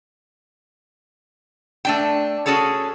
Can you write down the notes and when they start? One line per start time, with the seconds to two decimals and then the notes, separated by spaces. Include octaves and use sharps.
1.85 A3 D4 G5
2.46 C#4 F#4 G#4 A4 C#5